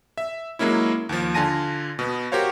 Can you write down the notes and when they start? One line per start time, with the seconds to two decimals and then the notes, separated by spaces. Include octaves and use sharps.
0.18 E5
0.59 F#3 G#3 A#3 C#4 E4
1.09 D#2 F3
1.34 D3 F4 G#5 A5 A#6 D#7
1.99 B2 B3
2.32 F#4 G4 A#4 C5 C#5 F5